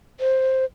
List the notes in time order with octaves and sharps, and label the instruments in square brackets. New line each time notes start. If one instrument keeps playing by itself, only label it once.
[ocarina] C5